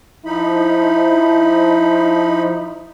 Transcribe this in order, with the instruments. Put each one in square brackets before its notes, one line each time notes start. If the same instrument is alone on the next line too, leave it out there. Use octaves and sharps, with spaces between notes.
[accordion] F3 D#4 B5 [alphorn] E4